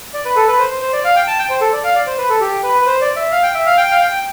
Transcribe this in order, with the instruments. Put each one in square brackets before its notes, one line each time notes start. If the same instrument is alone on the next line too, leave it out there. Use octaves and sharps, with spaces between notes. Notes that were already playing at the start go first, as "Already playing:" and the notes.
[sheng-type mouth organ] D5
B4
A4
B4
C5
C5
C5
D5
F5
G5
A5
G5
C5
A4
D5
F5
D5
C5
B4
A4
G4
B4
B4
C5
D5
E5
F5
G5
E5
F5
G5
F5
G5